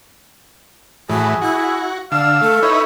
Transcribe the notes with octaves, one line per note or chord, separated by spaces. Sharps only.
A2 E3 F#4 G#4
E4 F#4
D3 D5 F5 E6
A3 A4
D#4 E4 B4 C#5